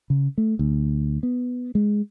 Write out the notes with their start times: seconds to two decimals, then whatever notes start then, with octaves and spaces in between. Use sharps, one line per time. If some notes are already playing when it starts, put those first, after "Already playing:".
0.10 C#3
0.38 A3
0.59 D2
1.23 B3
1.75 G#3